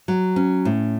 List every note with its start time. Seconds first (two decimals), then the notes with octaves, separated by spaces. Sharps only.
0.08 F#3
0.36 C#4
0.65 A2